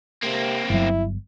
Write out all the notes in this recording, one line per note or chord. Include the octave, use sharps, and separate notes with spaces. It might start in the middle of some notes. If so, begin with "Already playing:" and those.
C3 A#3 C4
G1 F#3 E4